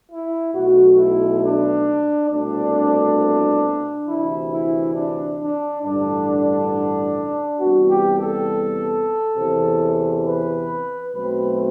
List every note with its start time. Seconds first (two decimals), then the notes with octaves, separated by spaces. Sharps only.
0.10 E4
0.54 B1 B2 A3 F#4
0.98 E4
1.42 D4
2.30 C2 B2 A3 C4 D4
4.06 D2 C3 E3 E4
4.52 E4
4.95 D4
5.40 D4
5.83 A1 G2 D3 D4
7.60 E2 C3 G3 B3 F#4
7.89 G4
8.18 A4
9.36 E2 C3 E3
10.26 B4
11.13 B1 B2 F#3 A3 C4 B4